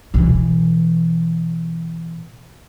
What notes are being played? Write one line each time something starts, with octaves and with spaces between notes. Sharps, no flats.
B2 E3